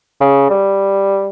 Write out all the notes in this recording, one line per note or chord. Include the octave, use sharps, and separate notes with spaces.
C#3
G3